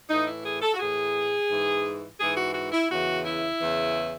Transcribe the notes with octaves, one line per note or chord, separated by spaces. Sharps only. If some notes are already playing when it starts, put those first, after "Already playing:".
A2 E3 D#4
E4
G#4
A4
F#4
A2 E3 G#4
G#2 E3
G#2 E3 G#4
F#4
F#4
E4
E2 C#3 E3 F#4
E4
E2 C#3 E3